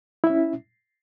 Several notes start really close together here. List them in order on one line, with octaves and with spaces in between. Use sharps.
E4 E5 C#4